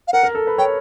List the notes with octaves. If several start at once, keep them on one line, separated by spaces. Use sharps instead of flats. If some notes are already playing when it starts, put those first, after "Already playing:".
F5
A#4 F#5
A#4
A4
B4
C#5 G5